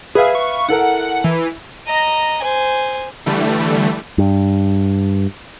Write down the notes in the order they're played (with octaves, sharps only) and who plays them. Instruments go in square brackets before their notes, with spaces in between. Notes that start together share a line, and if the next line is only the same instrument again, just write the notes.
[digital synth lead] G#4 [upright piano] B4 E5 F5
[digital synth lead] C#6
[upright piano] E4 A4 A#4 [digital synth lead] F#5
[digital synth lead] E3
[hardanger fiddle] D#5 A#5
C5 G#5
[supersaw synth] D3 E3 G3 A3
[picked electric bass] G2